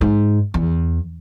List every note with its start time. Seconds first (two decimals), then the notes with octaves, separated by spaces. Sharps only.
0.01 G#2
0.54 E2